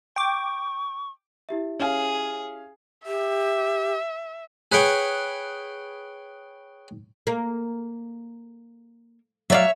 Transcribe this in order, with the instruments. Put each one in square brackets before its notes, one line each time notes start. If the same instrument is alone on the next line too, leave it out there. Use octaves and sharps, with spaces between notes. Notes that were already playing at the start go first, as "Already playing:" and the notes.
[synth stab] G5 D6 [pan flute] C#6
[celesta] E4 G4 E5
[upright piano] C#4 F5 [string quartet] G#4
[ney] G4 [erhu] E5
[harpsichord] G#4 B4 C#5 F#5 G5 C#6
[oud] A#3
[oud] F#3 D5 F5 [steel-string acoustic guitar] C#5 E5